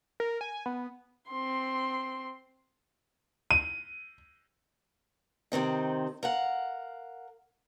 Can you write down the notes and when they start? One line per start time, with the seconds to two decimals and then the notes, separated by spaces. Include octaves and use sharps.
0.20 A#4
0.41 G#5
0.66 B3
1.29 C4 C6
3.51 D#7
5.52 C3 D#3 C4 D#4
6.23 A#4 F5 F#5